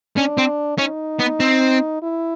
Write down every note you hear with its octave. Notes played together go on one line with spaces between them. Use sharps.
C#4 D4
C4
C#4 D#4
B3
C4
E4